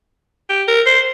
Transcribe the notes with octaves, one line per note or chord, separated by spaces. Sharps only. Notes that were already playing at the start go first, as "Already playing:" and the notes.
G4
A#4
C5